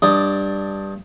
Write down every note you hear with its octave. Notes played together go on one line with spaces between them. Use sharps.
G2 D4 D#5 D#6